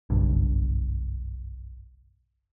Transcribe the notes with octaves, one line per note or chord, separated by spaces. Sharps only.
F#1 B1 G2